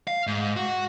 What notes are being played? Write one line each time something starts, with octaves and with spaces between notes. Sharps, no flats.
F5
G#2
F#4